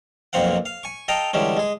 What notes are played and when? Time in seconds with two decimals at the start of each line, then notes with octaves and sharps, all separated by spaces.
0.33 B1 F2 A#3 C4 F5 F#5
0.66 F5
0.83 G#5 C#6
1.08 A4 D#5 F5 G5 A#5
1.33 D3 E3 G3 G#3 C#4
1.57 G#3 G#4